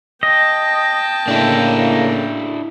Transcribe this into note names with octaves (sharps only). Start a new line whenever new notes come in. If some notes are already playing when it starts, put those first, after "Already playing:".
D#5 G5 A5
A2 C#3 A#3 D4 E4